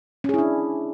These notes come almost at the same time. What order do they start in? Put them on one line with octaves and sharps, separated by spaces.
C#4 G#4 E4 D4